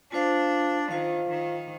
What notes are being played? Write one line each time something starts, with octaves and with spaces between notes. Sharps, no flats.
D4 F4 C5 F5
D#3 F4 C5 F5
D#3